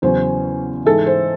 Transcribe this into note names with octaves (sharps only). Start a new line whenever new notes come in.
E2 C#3 F#3 C#4 C5
G#2 E3 G#3 A4
C5